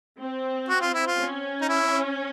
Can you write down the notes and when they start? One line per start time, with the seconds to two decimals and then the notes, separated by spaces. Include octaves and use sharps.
0.19 C4
0.69 F#4
0.81 F4
0.94 E4
1.07 F4
1.19 C#4
1.61 D#4
1.69 E4